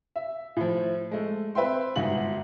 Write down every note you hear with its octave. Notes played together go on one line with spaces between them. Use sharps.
E5
A2 F3
G#3 A3
C4 B4 E5 G5 C6
G1 G#2 F#4 F#7